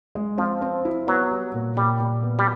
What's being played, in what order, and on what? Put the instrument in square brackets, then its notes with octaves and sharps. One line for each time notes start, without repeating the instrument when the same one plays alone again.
[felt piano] G#3
[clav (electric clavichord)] F3 [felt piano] C4
[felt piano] C4
E4
[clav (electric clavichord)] F#3 [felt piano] B3
[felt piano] G3
A#2
[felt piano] A#2 [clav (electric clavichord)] G3
[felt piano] A#2
B3
[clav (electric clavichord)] G3